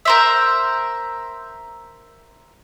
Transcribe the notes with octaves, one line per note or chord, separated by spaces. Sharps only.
A#4 C5 E5